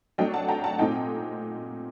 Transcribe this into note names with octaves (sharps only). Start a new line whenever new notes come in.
F#3 A3 D4 D#5 G5
F#5 A5
G5 A#5
F#5 A5
A#2 A3 C4 D#4 D#5 G5